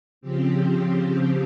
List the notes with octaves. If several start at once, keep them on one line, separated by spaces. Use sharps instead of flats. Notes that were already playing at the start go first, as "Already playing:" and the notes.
C#3 F3 C4 G4